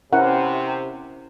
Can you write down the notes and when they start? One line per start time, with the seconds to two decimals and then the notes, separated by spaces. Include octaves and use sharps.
0.13 C3 C#4 E4 A#4 F#5